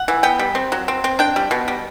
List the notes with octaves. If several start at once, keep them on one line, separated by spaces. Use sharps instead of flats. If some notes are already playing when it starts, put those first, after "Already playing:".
Already playing: F#5
E3
B3 G5
G3
C4
F#3
C4
C4
D4 G5
G3
B2
G3